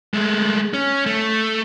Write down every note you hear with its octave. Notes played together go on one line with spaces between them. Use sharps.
G#3 A3
C#4
A3